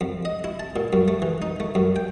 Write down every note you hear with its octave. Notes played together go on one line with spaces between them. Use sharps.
F2
D#5
E4
A5
A#2
F#2
A3
E3
D#4
A3
F#2
G5